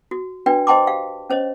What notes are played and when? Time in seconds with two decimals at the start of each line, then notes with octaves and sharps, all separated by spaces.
0.11 F#4
0.46 D4 F#4 B4 D5 G5
0.67 C5 D#5 G5 A5 C6 D6
0.87 G4 F5
1.30 C#4 C5 C#5 D#5